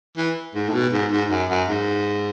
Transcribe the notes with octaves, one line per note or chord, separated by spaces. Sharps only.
E3
G#2
A2
B2
G#2
G#2
F#2
F#2
G#2